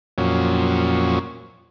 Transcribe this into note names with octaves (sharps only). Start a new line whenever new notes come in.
F2 A#2 F#3 C#4